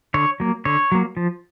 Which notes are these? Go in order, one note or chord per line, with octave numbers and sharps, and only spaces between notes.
D3 C#5
F#3 A#3
D3 C#5
F#3 A#3
F3